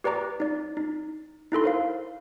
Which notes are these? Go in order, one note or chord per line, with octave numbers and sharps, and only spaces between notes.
G4 B4 D5 A#5 D6
D#4 D5
D#4
D#4 E4 A4 C6
A#4 C5 F5